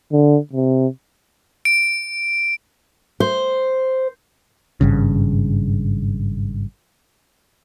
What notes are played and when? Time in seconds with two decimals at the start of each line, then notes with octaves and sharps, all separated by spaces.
0.12 D3
0.53 C3
1.65 D7
3.20 C5
4.81 G#1 G2 C#3